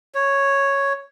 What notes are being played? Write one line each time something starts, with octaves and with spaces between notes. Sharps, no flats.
C#5